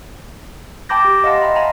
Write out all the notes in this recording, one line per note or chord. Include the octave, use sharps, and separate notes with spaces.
G5 A5 B5 D6 G6 A#6
G4
D#5 F5 F#5 A5 C6
D#5 E5 G5 A#5 B5
F5 G#5 A#5 B5